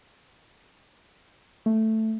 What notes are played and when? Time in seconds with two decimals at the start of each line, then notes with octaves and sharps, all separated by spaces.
1.66 A3